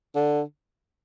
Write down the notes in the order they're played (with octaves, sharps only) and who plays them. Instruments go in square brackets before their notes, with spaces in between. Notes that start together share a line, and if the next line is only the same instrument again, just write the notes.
[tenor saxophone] D3